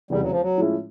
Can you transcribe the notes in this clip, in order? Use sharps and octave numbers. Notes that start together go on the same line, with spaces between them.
F1 E2 C#3 G3
F#3
F3
F#3
A2 F3 G#3 C#4 E4